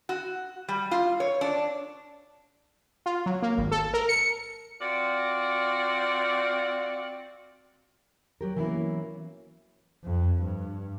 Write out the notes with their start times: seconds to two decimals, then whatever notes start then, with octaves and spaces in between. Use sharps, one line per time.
0.09 F#4
0.68 G3
0.91 F4
1.20 C#5
1.41 D4
3.06 F4
3.26 F#3
3.42 A#3
3.57 G#1
3.71 A4
3.94 A#4
4.09 C#7
4.80 C4 F4 F#4 D5
8.41 F#3 G4 A#4
8.56 E3 F#3 A#3 B3 C#4 E4
10.04 F2
10.42 G2